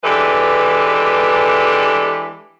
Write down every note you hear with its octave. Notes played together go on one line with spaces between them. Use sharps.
E3 G#3 D4 G4 A4 B4